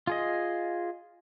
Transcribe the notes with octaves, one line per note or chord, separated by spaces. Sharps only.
F4 G#4 D#5